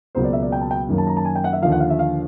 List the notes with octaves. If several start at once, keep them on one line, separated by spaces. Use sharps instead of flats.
C#2 B2 F#3 A#3 C5
D5
E5
D5
G5
A5
G5
F#2 D#3 F#3 A#3
A5
A#5
A5
G#5
G5
F#5
E5
D#2 D3 F3 F5
F#5
F5
E5
F5